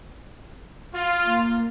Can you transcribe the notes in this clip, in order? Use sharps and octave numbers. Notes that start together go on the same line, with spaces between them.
F4
A#3